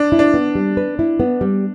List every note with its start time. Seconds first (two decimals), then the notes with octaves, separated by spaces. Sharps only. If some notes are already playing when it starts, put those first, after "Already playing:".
Already playing: D4
0.12 E4
0.19 D4
0.34 B3
0.55 G3
0.77 B4
0.99 E4
1.20 B3
1.41 G3